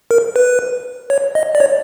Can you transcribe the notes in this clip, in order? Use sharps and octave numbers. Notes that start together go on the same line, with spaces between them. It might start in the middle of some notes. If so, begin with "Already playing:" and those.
A#4
B4
C#5
D#5
D5
C#5